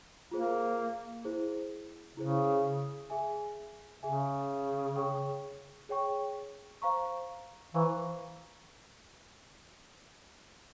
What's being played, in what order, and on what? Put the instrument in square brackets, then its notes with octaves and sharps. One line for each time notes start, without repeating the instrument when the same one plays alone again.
[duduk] A#3 [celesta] F4 G#4 C5
[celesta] E4 G#4 C5
[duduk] C#3 [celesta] E4 G#4 C5
[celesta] G#4 E5 G#5
[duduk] C#3 [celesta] G#4 E5 G#5
[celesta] G#4 C#5 G5 C#6
G#4 C#5 G5 C#6
C5 F5 A#5 C#6
[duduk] E3 [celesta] C5 F5 A#5 C#6